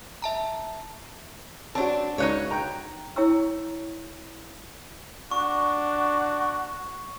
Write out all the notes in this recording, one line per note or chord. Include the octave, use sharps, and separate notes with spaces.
E5 A5 A#5
C4 D4 F#4 C#5 A5
C#2 C#4 D#4 F#4 C#5 F#6
G5 A#5
E4 C#5 G5 A#5 C#6 E6
D4 F#4 C#6